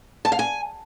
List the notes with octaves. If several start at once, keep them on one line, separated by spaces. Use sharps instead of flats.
A5
F5
G#5